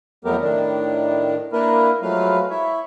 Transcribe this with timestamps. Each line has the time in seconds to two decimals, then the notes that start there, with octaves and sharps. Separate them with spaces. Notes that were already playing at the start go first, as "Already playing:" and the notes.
0.25 F2 F#3 A3 B3 G4 A#4
0.41 A2 D#3 D4
1.52 A#3 D4 E4 A#4 B4
2.02 F3 F#3 G#3 A3 B4 F5
2.50 E4 C#5 E5